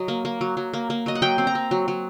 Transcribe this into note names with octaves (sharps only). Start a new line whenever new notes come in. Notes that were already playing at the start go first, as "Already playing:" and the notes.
Already playing: F#3 D#5
A#3
A#3
F#3
F#3
A#3
A#3
F#3 D#5
F#5
F#3 G5
C4
A#5
C4
F#3
F#3